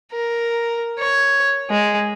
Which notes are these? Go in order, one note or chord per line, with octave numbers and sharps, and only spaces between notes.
A#4
C#5
G#3